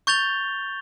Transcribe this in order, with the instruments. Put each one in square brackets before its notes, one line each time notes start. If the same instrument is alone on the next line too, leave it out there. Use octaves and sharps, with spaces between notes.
[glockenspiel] C#6 G6 A6 F7 G7